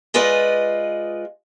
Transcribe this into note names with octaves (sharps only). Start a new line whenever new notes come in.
G#3 F4 B4 D5 D#5